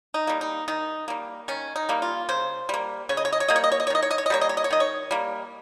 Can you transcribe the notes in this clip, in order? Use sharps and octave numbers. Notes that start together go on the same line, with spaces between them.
D#4
G3 A#3
D#4
D#3 D#4
G3 A#3
D#3 C#4
D#4
G3 A#3
F4
C#3 C5
G3 A#3
C#3 C#5
D#5
C#5
D#5
C#5
G3 A#3 D#5
C#5
D#5
C#5
D#5
C#5
D#3 D#5
C#5
D#5
C#5
D#5
G3 A#3 C#5
D#5
C#5
D#5
C#5
D#3 D#5
C#5
G3 A#3